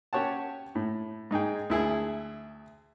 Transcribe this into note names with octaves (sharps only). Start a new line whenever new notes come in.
C#4 G4 C#5 F#5 A5
A2
G#2 D#4 G#4 G5
D2 E4 G#4